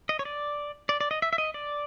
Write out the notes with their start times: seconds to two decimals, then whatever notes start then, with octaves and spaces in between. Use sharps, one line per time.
0.09 D#5
0.19 C#5
0.25 D5
0.89 D5
1.01 D5
1.11 D#5
1.22 E5
1.33 E5
1.38 D#5
1.54 D5